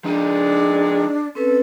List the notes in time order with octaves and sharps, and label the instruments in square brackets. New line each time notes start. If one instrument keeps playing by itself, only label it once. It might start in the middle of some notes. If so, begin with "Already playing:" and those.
[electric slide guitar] F3 D#4 [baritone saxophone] G#3 [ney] D4
[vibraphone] C4 C#4 B4 [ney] A4